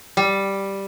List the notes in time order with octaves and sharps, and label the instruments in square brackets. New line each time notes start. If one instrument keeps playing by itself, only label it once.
[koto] G3